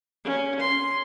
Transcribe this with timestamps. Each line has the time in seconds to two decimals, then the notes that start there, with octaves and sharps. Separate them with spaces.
0.24 C#4
0.59 C6